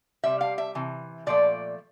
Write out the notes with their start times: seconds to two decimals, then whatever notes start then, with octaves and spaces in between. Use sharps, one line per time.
0.24 C3 G3 E5
0.41 F5
0.58 E5
0.75 C3 E3
1.26 A#2 F3 A3 D5